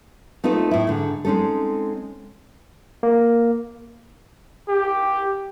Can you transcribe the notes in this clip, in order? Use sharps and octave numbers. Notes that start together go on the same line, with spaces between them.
A3 C4 D#4 F4 B4
A2 E4
G#2 D3
G#3 C4 C#4 D#4 A4
A#3
G4